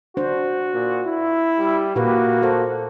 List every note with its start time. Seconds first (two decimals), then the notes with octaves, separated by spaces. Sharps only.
0.17 D4 F#4 C5
0.74 A#2
1.05 E4
1.58 G3
1.96 A#2 A#3 F#4 G4 B4
2.42 A4 C5